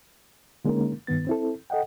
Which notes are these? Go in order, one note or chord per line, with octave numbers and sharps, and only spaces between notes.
D3 G#3 A#3 C#4 D#4 A#4
G2 D#3 B3 A6
C4 E4 A4
A4 D#5 F#5 G5